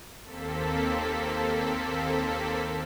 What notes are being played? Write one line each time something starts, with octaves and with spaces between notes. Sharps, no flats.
D#2 A#3 C4 A4 B6